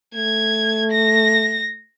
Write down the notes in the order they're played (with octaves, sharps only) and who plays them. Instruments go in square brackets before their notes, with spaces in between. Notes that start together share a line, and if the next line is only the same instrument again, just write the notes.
[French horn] A3 [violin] G#6
[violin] A#6